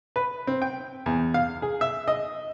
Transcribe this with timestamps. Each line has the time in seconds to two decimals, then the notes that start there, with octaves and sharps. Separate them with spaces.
0.16 B4
0.47 C4
0.62 G5
1.06 E2
1.34 F5
1.62 G#4
1.81 E5
2.08 D#5